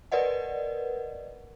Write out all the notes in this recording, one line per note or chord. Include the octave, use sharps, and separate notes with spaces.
A#4 B4 D5 D#5 F#5